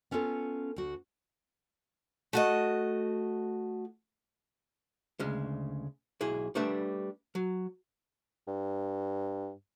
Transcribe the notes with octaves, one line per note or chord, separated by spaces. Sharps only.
B3 C#4 F4 F#4 A4
D2 F#4
A3 F#4 D#5
D2 C#3 G#3
B1 E4 G#4
G3 A3 D4 B4 E5
F#3
G2